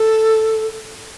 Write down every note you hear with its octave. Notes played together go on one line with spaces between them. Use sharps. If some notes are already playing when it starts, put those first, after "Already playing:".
Already playing: A4